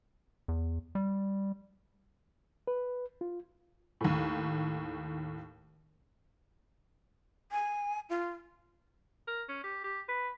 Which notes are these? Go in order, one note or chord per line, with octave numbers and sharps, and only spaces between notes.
E2
G3
B4
F4
D#2 A2
G#5
F4
A#4
C#4
G4
G4
B4